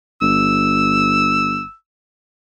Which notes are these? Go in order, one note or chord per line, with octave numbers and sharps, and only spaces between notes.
G1 E6